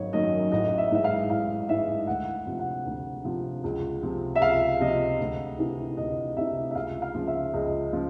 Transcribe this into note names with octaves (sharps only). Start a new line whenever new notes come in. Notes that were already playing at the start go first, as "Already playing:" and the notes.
Already playing: G#1 F#2 F#3 D#4 C#5
F#2 D#3 F#3 D#5
A1 D#5
E5
G#2 E3 E5
F5
A1 F5
G#2 E3 E5
D2 F#5
C3 F3
F#5
D2
C3 F3
C#2
C3 F3
E5
C#2 F5
C3 F3 D#5
D2
C3 E3
D2 D#5
C3 E3 E5
E5
C#2 F5
F5
C#3 F3
E5
C#2 D#5
C#3 F3